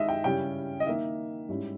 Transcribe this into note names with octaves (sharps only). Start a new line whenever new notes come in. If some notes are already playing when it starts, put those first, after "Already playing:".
Already playing: D#3 G#3 D#4 D#5 E5
G5
C#3 G3 C#4 E4 G5
D#5
D#3 A#3 D#4 E5
G#2 G3 C#4 E4